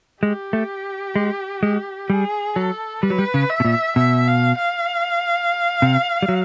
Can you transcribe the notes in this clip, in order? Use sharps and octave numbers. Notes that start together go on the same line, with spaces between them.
G#3 G4
A3
G#3
G#3
G3 G#4
F#3 A4
G3 B4
F#3
G3
C#3
E5
B2
A#2
B2 E5
F5
F5
C3
G3
F#3